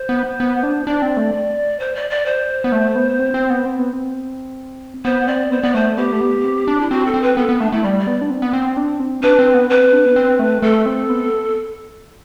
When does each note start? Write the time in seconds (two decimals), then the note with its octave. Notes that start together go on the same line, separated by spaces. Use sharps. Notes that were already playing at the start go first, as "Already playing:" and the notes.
Already playing: C5
0.09 B3
0.40 B3
0.63 D4
0.86 D4 D5
1.02 C4
1.17 A3
1.80 C5
1.95 D5
2.10 D5
2.26 C5
2.64 B3
2.72 A3
2.96 B3
3.19 C4
3.34 C4
3.50 B3
3.65 C4
3.79 B3
3.93 C4
5.05 B3 C5
5.28 C4 D5
5.51 B3 C5
5.63 B3 D5
5.74 A3 C5
5.97 B3 G4
6.13 A3
6.21 B3
6.44 C4
6.68 D4
6.81 E4
6.90 C4 F#4
7.06 A4
7.14 C4
7.22 B4
7.37 B3 A4
7.49 B3
7.60 A3 D4
7.72 A3 E4
7.83 G3 D5
7.99 D5
8.07 B3
8.21 D4
8.30 C4
8.42 B3
8.53 C4
8.77 D4
9.00 C4
9.23 D4 B4
9.39 C4
9.54 B3
9.70 C4 B4
9.93 D4
10.06 B3
10.16 C4
10.39 A3
10.62 A3 A4
10.86 C4
11.09 B3